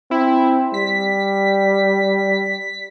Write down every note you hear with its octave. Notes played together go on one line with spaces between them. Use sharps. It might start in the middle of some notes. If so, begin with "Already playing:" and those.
C4 E4
G3 B6